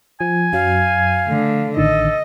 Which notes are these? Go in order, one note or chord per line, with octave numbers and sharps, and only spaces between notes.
F3 G#5
F#2 F#3 F5
D3 A3
A1 D3 D#3 A4 D#5